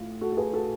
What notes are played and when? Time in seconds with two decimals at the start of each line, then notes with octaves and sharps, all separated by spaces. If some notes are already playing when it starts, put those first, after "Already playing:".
Already playing: A2 F4
0.21 F#4 A4
0.32 A4
0.37 G#4 B4
0.53 F#4 A4